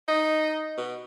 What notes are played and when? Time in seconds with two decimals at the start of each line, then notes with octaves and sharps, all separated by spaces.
0.08 D#4
0.77 B2